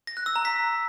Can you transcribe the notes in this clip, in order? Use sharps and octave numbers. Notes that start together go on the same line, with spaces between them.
A#6
F#6
E6
A#5
B6